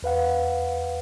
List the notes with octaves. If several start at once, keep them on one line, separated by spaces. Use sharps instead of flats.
E2 B4 F5 F#5